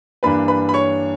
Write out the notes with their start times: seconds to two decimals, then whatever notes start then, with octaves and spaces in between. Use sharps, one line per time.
0.23 G2 E3 A#3 D4 B4 B5
0.48 B4 B5
0.69 B5
0.74 C#5 C#6